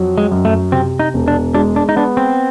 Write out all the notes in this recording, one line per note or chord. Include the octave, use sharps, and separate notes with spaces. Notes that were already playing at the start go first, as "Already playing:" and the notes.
Already playing: F2 F#3
G#3
F#2
A3
C3 C4
D#4
E1
D4
G#3 D4
D4
D#4
B3 D4
C4